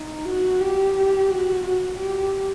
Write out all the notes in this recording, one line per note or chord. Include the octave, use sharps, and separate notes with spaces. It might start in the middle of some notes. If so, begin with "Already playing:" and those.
Already playing: D#4
F#4
G4
F#4
F#4
G4